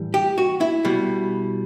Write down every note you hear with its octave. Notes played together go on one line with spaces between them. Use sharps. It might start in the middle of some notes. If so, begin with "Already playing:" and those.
Already playing: A2 E3 G3
G4
F#4
E4
B2 G3